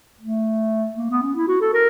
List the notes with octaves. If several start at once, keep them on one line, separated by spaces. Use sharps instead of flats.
A3
A#3
B3
C#4
E4
F#4
A4
A#4